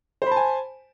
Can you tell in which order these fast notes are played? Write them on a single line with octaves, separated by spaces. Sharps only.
C5 B5 A5 G#5